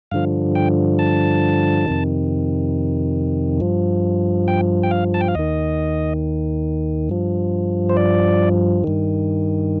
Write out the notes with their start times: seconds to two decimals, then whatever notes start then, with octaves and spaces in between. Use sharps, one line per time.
0.11 G2 D3 F3 F5
0.55 G5
0.99 A5
1.86 F2 C3 D#3
3.60 G2 F3
4.48 G5
4.83 G5
4.91 F5
5.14 A5
5.21 G5
5.28 F5
5.35 D#2 D#3 D#5
7.09 G2 F3
7.89 C5
7.97 D5
8.84 G2 D#3